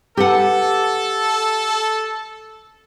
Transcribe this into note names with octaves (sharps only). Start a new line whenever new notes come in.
G4 A4 B4 F#5